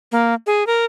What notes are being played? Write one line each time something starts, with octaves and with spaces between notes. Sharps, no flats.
A#3
G#4
A#4